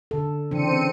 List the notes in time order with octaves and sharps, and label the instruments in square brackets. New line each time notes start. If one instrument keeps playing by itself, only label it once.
[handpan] D3 A4
[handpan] C#3 E3 D4 [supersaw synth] C4 C#7 D#7